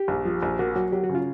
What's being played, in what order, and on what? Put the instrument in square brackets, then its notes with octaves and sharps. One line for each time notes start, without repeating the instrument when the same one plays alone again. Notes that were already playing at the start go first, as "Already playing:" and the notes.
Already playing: [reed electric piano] G4
[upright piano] A#1
F3
A#1
[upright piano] A#3 [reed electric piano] F#4
[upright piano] F#3 [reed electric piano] F#4
[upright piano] F#3 [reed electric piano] G4
[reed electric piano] F#4
[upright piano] C#3
[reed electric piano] F4